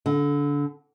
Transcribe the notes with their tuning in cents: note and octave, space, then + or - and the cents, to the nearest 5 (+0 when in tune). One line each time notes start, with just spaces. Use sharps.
D3 -25